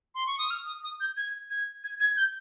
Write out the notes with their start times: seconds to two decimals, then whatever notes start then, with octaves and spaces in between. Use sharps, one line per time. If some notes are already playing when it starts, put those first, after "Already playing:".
0.15 C6
0.27 C#6
0.38 D#6
0.50 F6
0.66 D#6
0.83 D#6
1.00 G6
1.17 G#6
1.50 G#6
1.84 G#6
2.00 G#6
2.17 G6